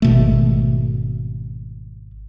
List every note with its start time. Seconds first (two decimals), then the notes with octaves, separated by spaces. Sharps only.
0.02 G#1 B2 A3